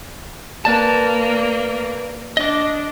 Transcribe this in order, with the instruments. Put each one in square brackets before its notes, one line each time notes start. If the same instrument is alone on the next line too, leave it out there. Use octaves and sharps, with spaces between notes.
[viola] A#3 [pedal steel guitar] B4 D5 A5
[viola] D4 [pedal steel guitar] D#5 D6